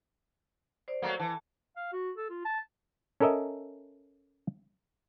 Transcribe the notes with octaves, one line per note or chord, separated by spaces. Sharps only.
C5 D5
F#3 A3 A#3
E3 A5
F5
F#4
A4
F4
A5
C#4 A4 A#4 D#5 E5